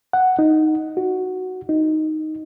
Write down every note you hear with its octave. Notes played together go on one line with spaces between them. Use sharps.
F#5
D#4
F#4
D#4